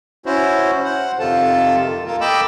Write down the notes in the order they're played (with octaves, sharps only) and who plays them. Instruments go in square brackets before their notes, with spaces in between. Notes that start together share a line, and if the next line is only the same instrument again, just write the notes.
[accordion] C#4 E4 F#4 C5
C5 F#5
F2 C3 D#3 F4 A4 A5
A#3 F4 A4 A#4
D#5 G5 A5 B5 D6 E6